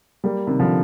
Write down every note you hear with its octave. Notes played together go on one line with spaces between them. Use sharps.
G3 A#3
C3 D#3
D3 F3